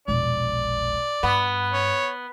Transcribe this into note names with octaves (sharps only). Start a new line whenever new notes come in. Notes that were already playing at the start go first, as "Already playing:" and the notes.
E1 A#1 D5
G2 B3
C#5